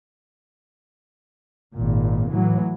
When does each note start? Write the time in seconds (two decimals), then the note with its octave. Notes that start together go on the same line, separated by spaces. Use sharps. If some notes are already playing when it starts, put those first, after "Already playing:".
1.74 G#1 A#2
2.31 A2 E3 F#3